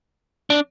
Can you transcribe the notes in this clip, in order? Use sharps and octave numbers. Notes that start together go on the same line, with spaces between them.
D4